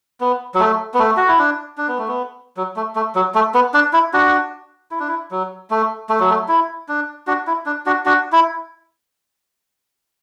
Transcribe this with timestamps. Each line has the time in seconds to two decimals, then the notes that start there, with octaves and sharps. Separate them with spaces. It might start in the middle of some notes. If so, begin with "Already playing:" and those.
0.20 B3
0.54 F#3
0.60 A3
0.94 B3
0.99 A3
1.17 F#4
1.28 E4
1.39 D4
1.78 D4
1.88 B3
1.98 A3
2.08 B3
2.57 F#3
2.76 A3
2.96 A3
3.15 F#3
3.34 A3
3.54 B3
3.74 D4
3.93 E4
4.13 D4 F#4
4.91 E4
5.00 D4
5.08 E4
5.31 F#3
5.70 A3
6.09 A3
6.20 F#3
6.30 A3
6.48 E4
6.89 D4
7.27 D4 F#4
7.47 E4
7.66 D4
7.86 D4 F#4
8.06 D4 F#4
8.32 E4